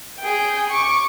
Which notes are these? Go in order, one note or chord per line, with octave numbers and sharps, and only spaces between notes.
G#4 G5
C#6 D6